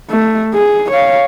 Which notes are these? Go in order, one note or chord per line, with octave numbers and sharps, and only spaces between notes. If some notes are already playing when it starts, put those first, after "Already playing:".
A3
G#4
C#5 F5